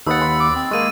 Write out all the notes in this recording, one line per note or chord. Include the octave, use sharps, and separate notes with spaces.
D#2 D#4 B4 C#5 F#5 E6 A6
B5 C6
D6
C4
G#3 A#3 G#4 C#6 D#7